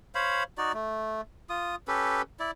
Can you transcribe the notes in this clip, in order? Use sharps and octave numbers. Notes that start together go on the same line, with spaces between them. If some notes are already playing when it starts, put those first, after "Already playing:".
C5 C#5 F5 B5
D#4 F#4 D5
A3
F4 D#6
C#4 G4 A4 B4
E4 D5